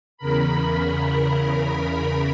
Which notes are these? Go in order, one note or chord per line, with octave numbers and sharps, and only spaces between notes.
E2 C#3 A#4 B5